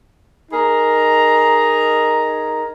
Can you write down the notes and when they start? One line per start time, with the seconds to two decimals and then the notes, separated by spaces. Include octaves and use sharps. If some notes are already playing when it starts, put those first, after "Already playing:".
0.52 D#4 G#4 A#4 A#5